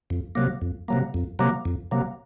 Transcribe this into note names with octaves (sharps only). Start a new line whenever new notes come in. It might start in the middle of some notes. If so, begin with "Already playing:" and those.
F2
C3 F#3 A#3
F2
C3 F#3 A#3
F2
C3 F#3 A#3
F2
C3 F#3 A#3